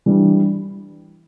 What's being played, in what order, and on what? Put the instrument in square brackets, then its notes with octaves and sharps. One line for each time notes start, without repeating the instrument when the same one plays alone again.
[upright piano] E3 G3 D4